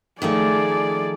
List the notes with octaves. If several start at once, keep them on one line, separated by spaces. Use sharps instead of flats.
D#3 F3 A3 G#4 D5